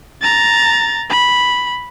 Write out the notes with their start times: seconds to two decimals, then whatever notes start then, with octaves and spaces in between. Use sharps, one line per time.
0.22 A#5 A6
1.09 B5